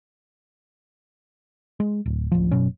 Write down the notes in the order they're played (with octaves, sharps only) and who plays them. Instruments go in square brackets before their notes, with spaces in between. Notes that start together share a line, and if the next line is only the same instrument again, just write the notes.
[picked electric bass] G#3
D1
D1 A1 F3
F#1 B2 F#3 C#4